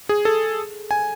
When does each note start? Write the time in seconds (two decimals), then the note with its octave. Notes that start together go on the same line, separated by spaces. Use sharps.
0.09 G#4
0.25 A4
0.91 G#5